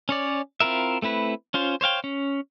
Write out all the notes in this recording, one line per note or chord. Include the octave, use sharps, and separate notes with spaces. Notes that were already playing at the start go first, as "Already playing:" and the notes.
C#4 C#5 D5
C4 E4 F4 A#4 E5
A3 C4 E4 B4
C#4 F4 C5
C5 C#5 F5 G5
C#4